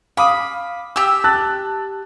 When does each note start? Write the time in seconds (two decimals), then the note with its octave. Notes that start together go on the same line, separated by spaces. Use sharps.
0.17 F5 B5 D6 D#6
0.96 G4 G5 E6
1.24 A5 F#6 A6